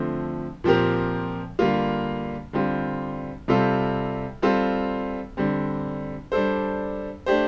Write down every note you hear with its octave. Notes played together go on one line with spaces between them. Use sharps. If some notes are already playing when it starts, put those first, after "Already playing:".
Already playing: D3 F3 A3 C4
A#2 F3 C4 G4 A#4
D3 G3 A#3 F4
D3 G3 C4 F4
C3 G3 C4 F4 A4
G3 C4 F4 A4
D3 G3 C4
G3 D4 A4 C5
A3 D4 G4 C5